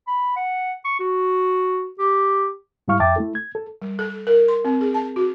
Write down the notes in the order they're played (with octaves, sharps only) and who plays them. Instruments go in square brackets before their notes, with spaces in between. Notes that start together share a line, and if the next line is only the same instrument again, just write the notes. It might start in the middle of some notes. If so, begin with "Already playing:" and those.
[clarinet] B5
F#5
C#6
F#4
G4
[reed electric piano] G#2 G3 E4 F5 C#6 F6
F2 E5 G5 A5 D6 A6
A3 E4 A4
G#6
A4
[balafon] G3
A4
A#4
C6
C4
G#4
A5
F#4